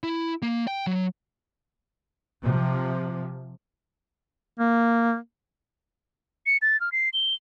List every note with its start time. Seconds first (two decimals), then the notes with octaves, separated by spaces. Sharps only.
0.03 E4
0.42 A#3
0.67 G5
0.87 F#3
2.43 C3 F3
4.59 A#3
6.46 C#7
6.62 A6
6.81 F6
6.92 C7
7.13 G7